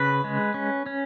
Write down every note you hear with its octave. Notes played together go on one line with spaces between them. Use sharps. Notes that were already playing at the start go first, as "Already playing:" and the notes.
Already playing: C#3 B4
G#3
C#4
C#4